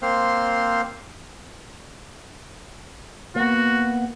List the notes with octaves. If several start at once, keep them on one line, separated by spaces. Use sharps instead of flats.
A#3 C4 C5 C6 F6
A#3 B3 F#4